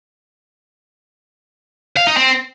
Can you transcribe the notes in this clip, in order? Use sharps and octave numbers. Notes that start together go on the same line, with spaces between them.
F5
D#4
C4